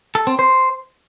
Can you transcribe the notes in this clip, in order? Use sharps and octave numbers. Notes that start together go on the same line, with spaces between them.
A4
C4
C5